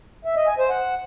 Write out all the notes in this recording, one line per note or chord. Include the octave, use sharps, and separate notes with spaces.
E5
D#5
G#5
C5
F#5